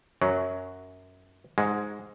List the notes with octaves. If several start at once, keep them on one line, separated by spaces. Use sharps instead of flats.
F#2 F#3
G#2 G#3